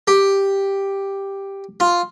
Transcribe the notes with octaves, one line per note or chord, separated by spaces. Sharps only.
G4
F4